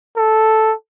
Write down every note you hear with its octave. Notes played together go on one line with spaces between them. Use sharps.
A4